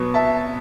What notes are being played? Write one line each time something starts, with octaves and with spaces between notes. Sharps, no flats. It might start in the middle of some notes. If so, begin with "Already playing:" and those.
Already playing: B2 F#3 B3 C#6
E5 A5